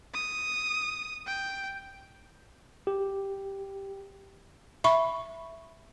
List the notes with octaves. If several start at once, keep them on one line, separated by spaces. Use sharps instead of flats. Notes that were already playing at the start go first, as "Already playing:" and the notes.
D#6
G5
G4
E5 B5 C#6